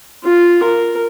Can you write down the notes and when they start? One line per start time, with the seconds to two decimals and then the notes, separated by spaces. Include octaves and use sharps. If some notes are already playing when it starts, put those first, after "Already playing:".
0.24 F4
0.63 A#4